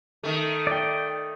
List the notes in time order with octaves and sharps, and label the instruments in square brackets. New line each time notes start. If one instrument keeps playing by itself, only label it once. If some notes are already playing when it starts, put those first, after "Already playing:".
[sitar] D#3 A3
[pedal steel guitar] D5 G5